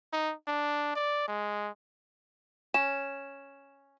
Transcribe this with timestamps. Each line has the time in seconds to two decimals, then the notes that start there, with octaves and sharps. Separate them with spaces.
0.13 D#4
0.47 D4
0.95 D5
1.28 G#3
2.74 C#4 E7